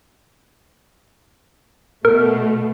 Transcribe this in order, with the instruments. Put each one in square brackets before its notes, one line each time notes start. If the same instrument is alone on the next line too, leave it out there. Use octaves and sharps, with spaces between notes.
[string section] B2 A3 [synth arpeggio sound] A#4